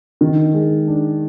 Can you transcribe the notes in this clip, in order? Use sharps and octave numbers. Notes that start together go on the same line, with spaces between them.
D#3
G#3
D4